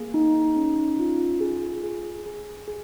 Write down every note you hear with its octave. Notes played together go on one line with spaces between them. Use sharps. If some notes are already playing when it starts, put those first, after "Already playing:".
Already playing: A#3 G#4
D#4
C#4
F4
G#4
G#4
G#4
G#4